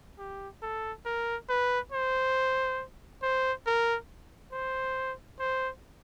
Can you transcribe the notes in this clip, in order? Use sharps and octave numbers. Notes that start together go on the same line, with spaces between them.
G4
A4
A#4
B4
C5
C5
A#4
C5
C5